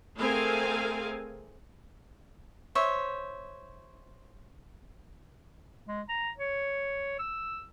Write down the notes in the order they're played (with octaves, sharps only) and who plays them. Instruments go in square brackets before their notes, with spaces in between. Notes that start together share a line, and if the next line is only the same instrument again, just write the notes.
[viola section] A3 C4 G#4 A#4 F5 G#5
[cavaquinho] C5 C#5 E5
[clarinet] G#3
A#5
C#5
E6